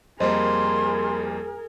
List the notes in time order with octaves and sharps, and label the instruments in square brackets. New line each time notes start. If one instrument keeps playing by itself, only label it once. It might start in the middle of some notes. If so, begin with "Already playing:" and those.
[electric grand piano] F2 G3 A#3 [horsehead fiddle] G#4 A#4 [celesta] C5 D#5 [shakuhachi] C6